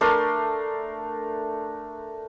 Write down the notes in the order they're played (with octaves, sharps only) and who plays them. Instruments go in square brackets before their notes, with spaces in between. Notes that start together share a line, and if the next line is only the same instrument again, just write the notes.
[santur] A3 D4 A#4 C6